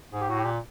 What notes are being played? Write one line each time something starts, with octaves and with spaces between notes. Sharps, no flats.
G#2 G#4
G4
A2 F#4
G4
A#2